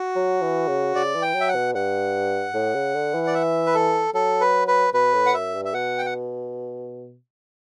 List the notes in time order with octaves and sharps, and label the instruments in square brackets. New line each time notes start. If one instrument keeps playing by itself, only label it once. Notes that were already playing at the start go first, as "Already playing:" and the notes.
Already playing: [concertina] F#4
[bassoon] F#3
E3
C#3
[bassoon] C#3 [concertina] D5
[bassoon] E3
[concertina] G5
[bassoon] F#3
[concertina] E5
F#5
[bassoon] B2
[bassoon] G2 [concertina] F#5
[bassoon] A2
C#3
D3
E3
[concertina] D5
E5
B4
A4
[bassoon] F#3 [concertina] A4
[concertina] B4
B4
[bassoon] B2 [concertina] B4
[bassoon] A2
[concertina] F#5
[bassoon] F#2 [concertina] E5
[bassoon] G2
[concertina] E5
[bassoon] B2 [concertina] F#5
[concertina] G5
F#5